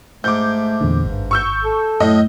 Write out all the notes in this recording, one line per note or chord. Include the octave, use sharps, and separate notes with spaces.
G#2 A3 D6 G6
E2 A#2 D3
G#1 G2
C#6 E6 G6
A4
F#2 A2 D#5